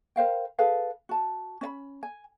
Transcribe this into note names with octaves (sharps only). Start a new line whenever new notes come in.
A#4 C5 F5 G5
G#4 A4 B4 F5
F#4 A5
C#4 D5 B5
G#5